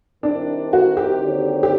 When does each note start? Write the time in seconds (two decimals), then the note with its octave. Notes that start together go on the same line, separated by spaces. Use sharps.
0.23 C2 C3 D#3 D4
0.73 F#4
0.97 G4
1.22 D#2 D3 F#3 C4
1.63 G4